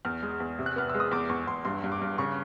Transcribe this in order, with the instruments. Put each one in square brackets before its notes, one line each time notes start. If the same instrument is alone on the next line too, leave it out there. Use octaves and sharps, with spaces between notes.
[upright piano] E2 F6
G#3
E2
C3
F#6
B3 F6
G#3 E6
D#6
E2 D6
E2 C#6
E2 C6
G2 C6
G2
D6
G2
C#3 C#6